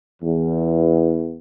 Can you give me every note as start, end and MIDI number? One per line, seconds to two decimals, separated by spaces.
0.22 1.39 40